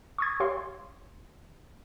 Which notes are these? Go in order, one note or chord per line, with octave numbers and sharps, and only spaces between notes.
C#6 D#6 G#6
G4 C#5 F5 C6